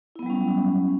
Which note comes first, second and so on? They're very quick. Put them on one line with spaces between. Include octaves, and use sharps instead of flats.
E4 B3 F#3 G3 C#4